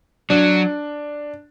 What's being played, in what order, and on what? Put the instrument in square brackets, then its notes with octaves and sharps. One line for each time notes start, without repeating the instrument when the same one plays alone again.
[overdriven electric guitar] F#3 [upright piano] D4